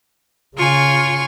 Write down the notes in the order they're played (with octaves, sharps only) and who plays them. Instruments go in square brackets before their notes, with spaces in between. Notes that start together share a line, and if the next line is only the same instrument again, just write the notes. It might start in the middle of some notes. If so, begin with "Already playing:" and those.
[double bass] C#3 [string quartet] F4 G#5 C#6